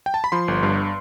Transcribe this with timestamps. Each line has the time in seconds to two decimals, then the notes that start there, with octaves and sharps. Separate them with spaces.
0.06 G5
0.14 A5
0.24 B5
0.32 F3 C6
0.48 G1
0.63 G2